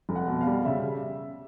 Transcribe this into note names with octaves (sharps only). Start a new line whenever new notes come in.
F1
F#5
B2
F5
G3
C#3 E5